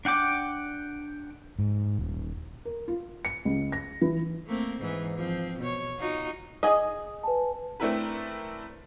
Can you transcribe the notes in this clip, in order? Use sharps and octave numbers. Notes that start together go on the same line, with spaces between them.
D4 F#5 G5 D6
G#2
D#1
A#4
F4
C#7
C#2
A#6
E3
A3 A#3 C4
G#2 E3
F3 C4
B2 C#5
D#4 F4 F#4
G#4 D#5
B4 G#5 A5
A3 C4 D4 E4 A#4 B4